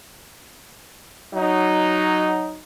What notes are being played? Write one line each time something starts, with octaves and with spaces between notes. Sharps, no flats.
F#3 D#4